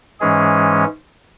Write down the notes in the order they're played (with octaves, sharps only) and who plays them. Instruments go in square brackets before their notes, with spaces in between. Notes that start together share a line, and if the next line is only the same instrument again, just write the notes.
[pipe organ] G#2 E3 G#3 C#4 G#4